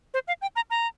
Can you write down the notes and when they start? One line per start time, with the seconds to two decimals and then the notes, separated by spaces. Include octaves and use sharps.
0.14 C5
0.28 F5
0.42 G5
0.56 A#5
0.70 A#5